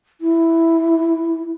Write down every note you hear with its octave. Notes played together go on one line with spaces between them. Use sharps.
E4